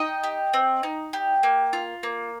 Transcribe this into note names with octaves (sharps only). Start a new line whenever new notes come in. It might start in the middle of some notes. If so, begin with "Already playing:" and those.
Already playing: D#4 D#5 G5
G4
C4
D#4
G4
A#3
F4
A#3